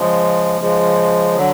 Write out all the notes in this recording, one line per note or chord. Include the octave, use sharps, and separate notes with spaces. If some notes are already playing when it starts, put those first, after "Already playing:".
Already playing: C#3 F3 G#3
C#3 F3 G#3
D3 F#3